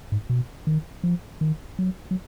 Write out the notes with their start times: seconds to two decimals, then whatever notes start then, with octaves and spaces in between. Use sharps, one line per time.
0.12 G#2
0.30 B2
0.67 D#3
1.04 F3
1.41 D#3
1.79 F#3
2.11 F#3